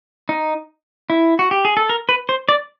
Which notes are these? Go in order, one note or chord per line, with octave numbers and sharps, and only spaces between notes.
D#4
E4
F#4
G4
G#4
A4
A#4
B4
C5
D5